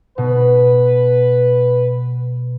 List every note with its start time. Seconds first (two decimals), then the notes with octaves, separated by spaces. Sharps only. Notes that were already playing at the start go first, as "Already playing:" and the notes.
0.18 B2 B4